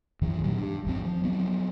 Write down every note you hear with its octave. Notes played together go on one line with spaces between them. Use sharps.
F#2 D#3 E3
A#2 D#3 F#3 G3
G2
G#1 F2 C4
F3
F#3 B3 C4